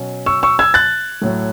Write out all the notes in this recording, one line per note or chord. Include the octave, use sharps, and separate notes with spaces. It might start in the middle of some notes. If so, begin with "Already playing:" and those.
Already playing: B2 F#3 C#4
C#6 E6
C#6 E6
E6 G#6
F#6 A6
A2 F#3 A3